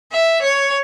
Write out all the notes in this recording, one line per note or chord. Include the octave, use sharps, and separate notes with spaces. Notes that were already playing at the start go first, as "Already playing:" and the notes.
E5
C#5